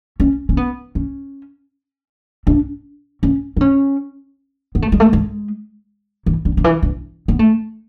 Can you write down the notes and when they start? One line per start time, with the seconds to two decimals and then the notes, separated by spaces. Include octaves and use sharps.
0.20 C#4
0.49 C#4
0.57 B3
0.95 C#4
2.47 D4
3.23 C#4
3.57 D4
3.61 C#4
4.75 B3
4.82 A3
4.92 G#3
5.00 A3
5.13 G#3
6.26 E3
6.45 D3
6.57 D3
6.64 E3
6.83 D3
7.28 B3
7.39 A3